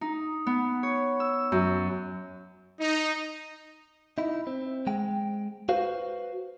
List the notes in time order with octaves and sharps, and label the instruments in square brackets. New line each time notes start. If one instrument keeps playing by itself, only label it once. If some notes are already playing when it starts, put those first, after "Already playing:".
[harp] D#4
B3
C#5
E6
F#2
[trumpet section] D#4
[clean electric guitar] D#4 E4
C4
G#3 G5
F#4 B4 C5 F5